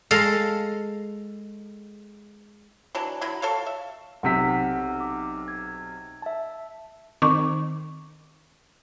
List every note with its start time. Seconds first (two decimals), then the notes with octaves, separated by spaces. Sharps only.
0.11 G#3 A4 F5
2.95 E3 F#3 D4
3.21 D3 F#3 E4
3.42 A4 C#5 E5 F5
3.67 E5
4.23 B1 C3 F#5 B6
5.00 D6
5.48 G#6
6.22 E5 A5
7.22 D#3 C4 C#6 D6